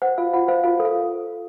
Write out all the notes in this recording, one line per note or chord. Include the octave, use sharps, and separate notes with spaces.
C5 F#5
F4 F5
F4 F#5
C5 F5
F4 F5
A4
F5